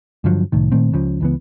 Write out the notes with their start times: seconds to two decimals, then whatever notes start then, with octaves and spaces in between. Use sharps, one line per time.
0.24 G2 D3 F3 F#3
0.52 C2 A2 D#3
0.72 A#2 D#3 A3 C4
0.92 C#2 C#3 F3
1.21 C#2 E3 B3